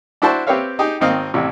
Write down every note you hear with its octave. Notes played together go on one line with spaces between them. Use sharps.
D4 E4 F#4 C5 A5 C#6
C4 G4 B4 C#5 E5 F5
D#4 G4 G#4
G#1 D#3 C4 D#5 F5
A1 C3 E4